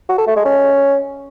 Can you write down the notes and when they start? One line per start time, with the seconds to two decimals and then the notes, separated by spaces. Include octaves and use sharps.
0.09 F#4
0.18 A4
0.27 A3
0.36 G#3
0.45 C#4